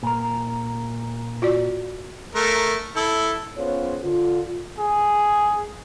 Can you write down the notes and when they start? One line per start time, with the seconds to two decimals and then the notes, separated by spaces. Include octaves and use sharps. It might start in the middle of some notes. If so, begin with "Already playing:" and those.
0.03 A#2 A#4
1.42 F4 F#4 D5
2.35 A3 A#4
2.96 E4 A4
3.57 B3 C#4 F4 G#4 C5 C#5
4.03 D3 F4
4.78 G#4